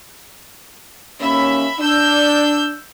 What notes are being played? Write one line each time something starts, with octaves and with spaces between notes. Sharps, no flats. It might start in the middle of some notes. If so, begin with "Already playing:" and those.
D#2 A#3 C#4 E5 B5
D4 E6 G6